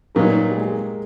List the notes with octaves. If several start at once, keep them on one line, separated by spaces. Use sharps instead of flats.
A#2 F#3 A#3 B3 D#4 A#4
G4
G#3 G#4